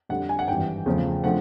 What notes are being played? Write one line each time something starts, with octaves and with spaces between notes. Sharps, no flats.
F2 D3 G3 F#5
G#5
F#5
G#1 G2 E3 G5
E2 C#3 F3 A3
D3 F3 A3 F#5